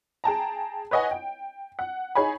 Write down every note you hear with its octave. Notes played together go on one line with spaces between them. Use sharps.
G#4 G5 A5 A#5
B4 C#5 D#5 F#5 G#5
G5
F#5
D#4 G#4 C#5 G#5 B5